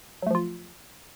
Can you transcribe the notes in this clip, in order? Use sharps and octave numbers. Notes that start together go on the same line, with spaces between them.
F3 F#3 A3 F4